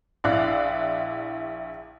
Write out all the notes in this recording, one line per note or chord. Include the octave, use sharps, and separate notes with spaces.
A#1 E4 D5 F5 F#6